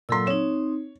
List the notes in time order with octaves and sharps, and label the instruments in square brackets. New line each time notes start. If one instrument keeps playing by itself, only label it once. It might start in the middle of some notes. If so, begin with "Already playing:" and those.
[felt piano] A#2 C6 [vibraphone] F#3 A4 E6
[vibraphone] C4 D#4 [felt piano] C#5